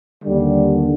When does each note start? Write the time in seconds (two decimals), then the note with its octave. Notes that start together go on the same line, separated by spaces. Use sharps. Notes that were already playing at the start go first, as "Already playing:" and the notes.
0.24 D#2 D3 G3